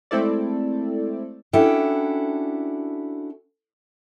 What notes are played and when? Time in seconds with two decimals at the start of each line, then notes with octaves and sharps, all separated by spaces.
0.11 G#3 A3 C4 E4 A4 D5
1.53 C#4 D4 E4 F#4 A4 G5